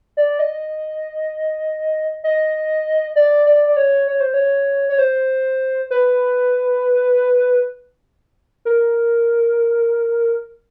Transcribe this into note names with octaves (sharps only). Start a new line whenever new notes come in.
D5
D#5
D#5
D5
D5
D5
C#5
C#5
C5
C#5
C#5
C5
B4
A#4